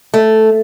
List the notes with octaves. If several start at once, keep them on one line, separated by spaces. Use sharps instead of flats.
A3